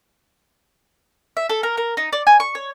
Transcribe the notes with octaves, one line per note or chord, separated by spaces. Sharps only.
E5
A4
A#4
A#4
D#4
D5
G#5
C#6
C#5